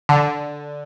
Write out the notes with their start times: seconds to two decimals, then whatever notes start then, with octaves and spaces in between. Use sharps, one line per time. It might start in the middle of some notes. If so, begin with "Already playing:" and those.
0.09 D3